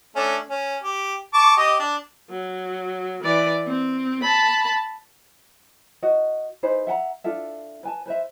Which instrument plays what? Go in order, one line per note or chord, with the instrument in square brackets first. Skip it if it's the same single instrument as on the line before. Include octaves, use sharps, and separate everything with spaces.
[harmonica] A3 C#4 D4
C#4
G4
A5 C#6 D6
G4 D#5
D4
[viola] F#3
E3 D5
C4
A5 B5
[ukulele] F#4 D#5
D#4 G#4 B4 C5
E5 F#5 G5 A#5
D4 F4 A4 E5
B4 G#5 A5
B4 C5 E5